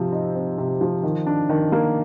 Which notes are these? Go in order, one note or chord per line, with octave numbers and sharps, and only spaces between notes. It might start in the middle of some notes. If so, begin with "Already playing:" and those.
Already playing: C3 F3 C4
D#4
C4
C3
F3
D#3
D4
D#3
A#3